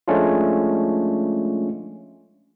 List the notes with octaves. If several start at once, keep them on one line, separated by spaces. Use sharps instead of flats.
F3 G#3 A3 C#4 D4 F4